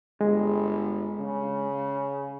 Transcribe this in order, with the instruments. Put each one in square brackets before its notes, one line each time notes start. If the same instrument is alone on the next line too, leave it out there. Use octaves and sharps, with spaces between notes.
[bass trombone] G1 [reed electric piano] G#3
[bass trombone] C#3